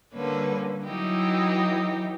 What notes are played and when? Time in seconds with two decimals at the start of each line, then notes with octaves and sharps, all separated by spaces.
0.13 D3 G3 A#3 C#4 B4
0.84 E3 F#3 D#4 E4 G4